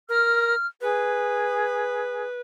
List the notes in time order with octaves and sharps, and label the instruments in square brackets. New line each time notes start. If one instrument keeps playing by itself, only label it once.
[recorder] A#4 [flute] F6
[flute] G#4 [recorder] B4